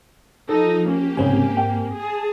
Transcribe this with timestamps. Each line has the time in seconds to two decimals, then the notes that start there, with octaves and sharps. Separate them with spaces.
0.49 F3 D#4 A4
0.88 A#3 C#4 G4
1.17 C2 G#2 C#3 C4 C#5 G#5
1.57 G5
1.96 G#4 A5